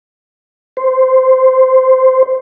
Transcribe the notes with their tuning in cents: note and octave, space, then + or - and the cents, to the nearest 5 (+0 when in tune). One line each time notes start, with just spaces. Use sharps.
C5 -10